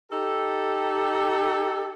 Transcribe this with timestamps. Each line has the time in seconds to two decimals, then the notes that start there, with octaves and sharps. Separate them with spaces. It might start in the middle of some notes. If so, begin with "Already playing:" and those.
0.12 D#4 G4 A4